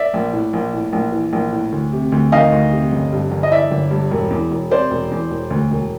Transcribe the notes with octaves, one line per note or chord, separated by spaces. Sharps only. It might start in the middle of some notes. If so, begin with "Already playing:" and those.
Already playing: D5 E5
A#1
A2
A#1
A2
A#1
E3
A#1
A2
D2
C3
D2
D#3 D#5 F5
D2
C3
G1
G2
G1
D#5
E3 D5 E5
G1
G2
E1
E2
E1
C3 C5 D5
E1
E2
E1
D2
E1